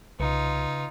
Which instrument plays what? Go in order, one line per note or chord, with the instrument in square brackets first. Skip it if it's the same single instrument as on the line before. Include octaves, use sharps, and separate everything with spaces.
[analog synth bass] C2 [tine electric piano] C#3 B4 C#7 [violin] D#4 F4